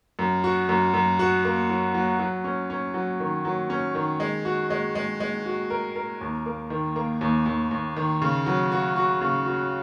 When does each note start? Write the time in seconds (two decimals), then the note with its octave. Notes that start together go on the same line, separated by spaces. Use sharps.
0.19 F#2
0.44 F#4
0.69 F#2
0.94 F#2
1.19 F#4
1.45 A#3
1.69 F#3
1.95 F#3
2.19 F#3
2.44 C#4
2.70 C#4
2.94 F#3
3.20 D#3
3.45 F#3
3.70 C#4
3.95 D#3
4.20 G#3
4.45 F#4
4.70 G#3
4.95 G#3
5.20 G#3
5.46 F#4
5.70 A#4
5.96 A#4
6.21 D#2
6.46 A#3
6.70 D#3
6.96 A#3
7.21 D#2
7.46 D#2
7.71 D#2
7.97 D#3
8.22 C#3
8.46 F#3
8.72 F#4
8.96 F#4
9.21 C#3
9.46 F#4